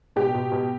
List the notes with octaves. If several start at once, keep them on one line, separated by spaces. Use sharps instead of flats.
B2 G4
B2
B2